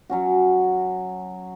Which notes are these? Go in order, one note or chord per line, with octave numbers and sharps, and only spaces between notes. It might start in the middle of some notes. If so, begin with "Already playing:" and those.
F#3 C#4 F#4